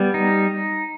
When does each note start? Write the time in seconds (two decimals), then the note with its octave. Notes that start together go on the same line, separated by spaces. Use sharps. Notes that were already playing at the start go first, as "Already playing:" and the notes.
Already playing: G3 B3
0.14 D#4